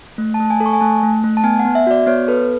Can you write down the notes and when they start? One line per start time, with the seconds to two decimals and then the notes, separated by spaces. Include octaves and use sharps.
0.18 A3
0.34 A5
0.40 A3
0.45 A5
0.50 G#5
0.60 A4
0.66 C#6
0.73 G#5
0.81 A3 A5
1.03 A3
1.24 A3
1.37 A5
1.44 B3 G#5
1.59 F#5
1.65 B3
1.75 E5
1.87 F#4 D5
2.07 B3 C#5
2.28 A4 B4